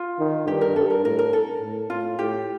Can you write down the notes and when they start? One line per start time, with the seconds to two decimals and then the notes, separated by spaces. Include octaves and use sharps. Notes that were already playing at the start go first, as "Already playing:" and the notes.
Already playing: F4
0.19 D#3
0.47 G2 G4
0.61 A#4
0.76 G2 A4
0.90 A#4
1.04 A2 A#4
1.19 A#4
1.33 A4
1.62 A2
1.90 A2 F4
2.18 A2 G4